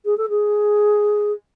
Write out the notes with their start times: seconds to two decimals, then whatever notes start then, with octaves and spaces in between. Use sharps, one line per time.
0.05 G#4
0.17 A4
0.29 G#4